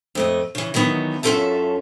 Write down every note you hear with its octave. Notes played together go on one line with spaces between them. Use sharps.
F2 A3 D#5
C#3 E3
D#3 E3 F#3 B3 D#4
F#2 C#4 F4 A4 E5 A5